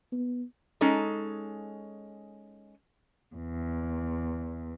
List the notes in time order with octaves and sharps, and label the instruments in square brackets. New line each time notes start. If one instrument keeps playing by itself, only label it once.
[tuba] B3
[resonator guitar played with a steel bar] G#3 C#4 D#4 A4
[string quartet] E2